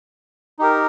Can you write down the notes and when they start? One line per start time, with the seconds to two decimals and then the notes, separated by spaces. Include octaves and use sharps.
0.59 D#4 G4 A#4